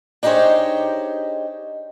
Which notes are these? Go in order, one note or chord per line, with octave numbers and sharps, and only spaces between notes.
D4 D#4 G4 G#4 C5 C#5